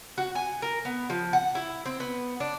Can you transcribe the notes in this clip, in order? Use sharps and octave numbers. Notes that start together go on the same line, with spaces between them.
F#4
G#5
A#4
B3
F3
F#5
E4
C4
B3
D4